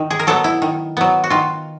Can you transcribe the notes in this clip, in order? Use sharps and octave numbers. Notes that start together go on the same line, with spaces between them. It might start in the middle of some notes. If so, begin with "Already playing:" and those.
Already playing: D#3
G#4
A#4
F#3 B3 A4
E4
D#3
F#3 B3
F#4
D#3 F4